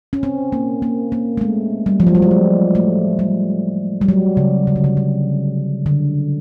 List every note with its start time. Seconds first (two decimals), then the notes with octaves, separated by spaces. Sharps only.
0.13 C#4
0.23 C4
0.52 A#3
0.82 A#3
1.12 A#3
1.37 A3
1.41 G#3
1.86 G3
2.00 F3
2.07 F#3
2.15 G3
2.22 G#3
2.31 A3
2.75 A3
3.19 G3
4.01 G3
4.09 F#3
4.37 C#3
4.67 C#3
4.76 D3
4.84 C#3
4.97 C#3
5.86 D3